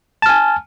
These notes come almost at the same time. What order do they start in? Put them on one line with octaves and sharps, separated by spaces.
A5 F6 G#5